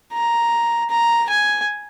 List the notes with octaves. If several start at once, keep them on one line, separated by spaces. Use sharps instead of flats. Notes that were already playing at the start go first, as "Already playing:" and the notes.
A#5
A#5
G#5